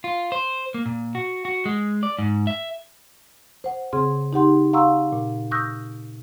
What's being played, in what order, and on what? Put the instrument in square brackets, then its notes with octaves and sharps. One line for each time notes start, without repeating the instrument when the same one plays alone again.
[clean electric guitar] F4
C5
A#3
A#2
F#4
F#4
G#3
D5
G#2
E5
[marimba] C5 F#5
C#3 C4 G#4 F#5 C6
D#4 G4 F#5 C6
F5 F#5 A#5 C6 C#6 E6
A#2
C#6 D#6 E6 F#6 G6 A#6